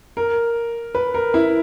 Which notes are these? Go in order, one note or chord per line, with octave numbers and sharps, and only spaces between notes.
A#4
B4
A#4
E4